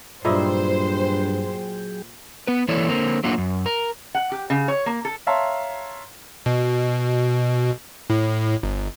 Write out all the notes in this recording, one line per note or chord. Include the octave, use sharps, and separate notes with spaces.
G2 A#2 F#3 E4 G#4 C5 D#5 G5
B3 B4
E3 A#3 E4 A4 C#5 D5
D3 A#3 C4
F#3 A3 A#3 D4 F4 F#4
F#2
A#4
F#5
G4
C#3
C#5
A#3
A4
C#5 E5 F5 A5 A#5 C6
B2
A2
G1